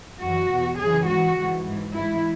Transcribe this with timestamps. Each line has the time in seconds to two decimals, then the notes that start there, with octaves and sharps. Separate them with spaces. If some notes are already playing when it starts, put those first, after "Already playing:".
0.22 F#2 E3 F#4
0.52 E2 B2
0.80 F#2 C#3 E3 G#4
1.09 G#2 E3 F#4
1.37 G#2 E3
1.65 G#2 E3
1.94 G#2 E3 E4